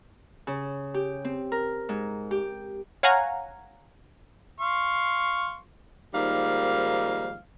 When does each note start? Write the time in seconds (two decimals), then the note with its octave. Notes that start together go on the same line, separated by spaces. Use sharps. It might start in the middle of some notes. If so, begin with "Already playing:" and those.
0.47 C#3
0.94 G4
1.25 C4
1.52 A#4
1.89 G#2
2.31 G4
3.03 C#5 F5 F#5 G#5 A#5
4.60 F5 C6 C#6
6.14 G#2 D#3 F3 G3 A#3 F5